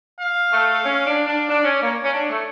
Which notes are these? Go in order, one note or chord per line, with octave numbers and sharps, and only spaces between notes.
F5
A3
C#4
D4
D4
D4 D5
C#4
A#3 C#5
C#4
D4
A3